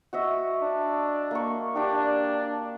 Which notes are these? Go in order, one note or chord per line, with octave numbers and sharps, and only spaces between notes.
F#4 D#5 E5
D4
A#3 C#6
D4 G4 G5